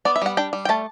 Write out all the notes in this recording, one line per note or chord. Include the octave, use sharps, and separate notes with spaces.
B3 D5
E5
G3 F#5
D4 G5
G3
G5
A3 A5